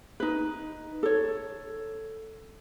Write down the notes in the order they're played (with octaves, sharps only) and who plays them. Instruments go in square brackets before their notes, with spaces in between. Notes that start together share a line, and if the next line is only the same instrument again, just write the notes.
[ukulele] D#4 B4
A4 C#5